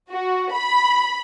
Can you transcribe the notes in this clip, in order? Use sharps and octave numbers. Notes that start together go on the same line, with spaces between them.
F#4
B5